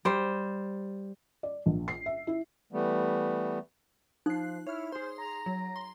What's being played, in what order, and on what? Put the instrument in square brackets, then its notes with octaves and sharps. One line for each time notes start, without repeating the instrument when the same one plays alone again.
[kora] G3 C5
[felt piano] D5
A#1
C7
E5
E4
[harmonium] E3 G3 A3 B3
[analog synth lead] F3 [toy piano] D#4 [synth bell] F#6 C7
[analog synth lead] E4 [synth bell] C#5 F6
[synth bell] G#4 C6 [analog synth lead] C5
[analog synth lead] A#5
[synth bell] F#3
C6